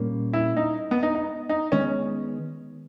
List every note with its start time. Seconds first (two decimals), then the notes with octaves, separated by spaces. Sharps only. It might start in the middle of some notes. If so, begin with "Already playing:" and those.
Already playing: A#2 G3 A#3 C#4
0.33 E4
0.57 D#4
0.91 B3
1.03 D#4
1.15 D#4
1.49 D#4
1.72 D#3 G#3 B3 C#4